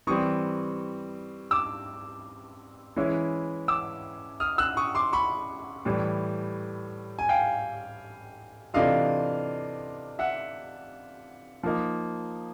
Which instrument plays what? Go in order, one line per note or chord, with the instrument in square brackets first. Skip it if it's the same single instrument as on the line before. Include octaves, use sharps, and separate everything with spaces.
[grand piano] E3 G3 C4 C#6 D#6
D6 E6
E3 G#3 C#4 E4
D6 E6
D#6 F6
E6 F#6
C#6 D#6
C6 D6
B5 C#6
A2 E3 G3
G#5
F5 G5
C3 E3 A3 D4 F4 D#5 F5
E5 F#5
F3 A#3 D#4